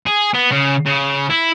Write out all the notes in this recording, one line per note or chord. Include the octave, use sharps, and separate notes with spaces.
G#4
B3
C#3
C#3
E4